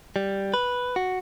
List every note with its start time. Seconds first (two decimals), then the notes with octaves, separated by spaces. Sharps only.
0.16 G3
0.54 B4
0.96 F#4